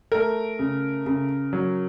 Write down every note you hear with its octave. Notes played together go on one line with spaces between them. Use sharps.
A3 A#4
C#3
C#3
F#3